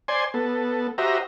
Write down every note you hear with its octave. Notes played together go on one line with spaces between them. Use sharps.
C5 D5 G#5 C6
B3 A4
F#4 G4 C5 D#5 E5 A#5